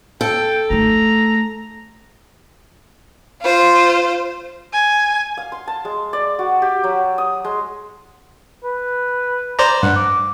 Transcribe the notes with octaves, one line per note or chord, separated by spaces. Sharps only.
A4 G5
A3 D#4 A#5
F4 C5
G#5
F5
C6
A5
G#3
D5
F#4
G4
F#3
D#6
G#3
B4
C5 D5 A#5
G2 F#5
D6